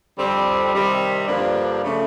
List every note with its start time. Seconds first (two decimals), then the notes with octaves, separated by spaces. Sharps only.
0.17 F2 D3 G3 C4
0.72 C3 D#3 G3 C4
1.27 G2 D3 F3 A#3 D4
1.82 C#3 F3 A3